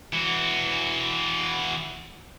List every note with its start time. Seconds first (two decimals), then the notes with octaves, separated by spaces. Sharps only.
0.13 E3 F#4